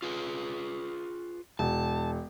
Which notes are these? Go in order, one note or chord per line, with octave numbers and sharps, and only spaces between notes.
F4 G#4 B4
E1 A5